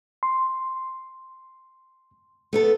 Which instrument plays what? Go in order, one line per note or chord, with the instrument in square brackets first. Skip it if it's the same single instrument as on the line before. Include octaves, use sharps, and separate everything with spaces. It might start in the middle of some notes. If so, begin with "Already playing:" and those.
[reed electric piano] C6
[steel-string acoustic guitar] A3 B3 A4